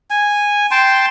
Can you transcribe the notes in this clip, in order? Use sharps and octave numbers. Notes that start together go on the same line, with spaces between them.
G#5
G5 A5 C6